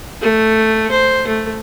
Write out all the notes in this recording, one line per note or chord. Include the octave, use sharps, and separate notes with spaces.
A3
C5
A3